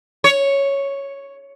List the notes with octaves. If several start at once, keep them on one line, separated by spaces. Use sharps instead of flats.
C#5